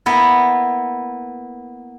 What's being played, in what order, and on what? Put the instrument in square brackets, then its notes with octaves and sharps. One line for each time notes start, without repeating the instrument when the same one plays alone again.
[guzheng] A#3 B3 E4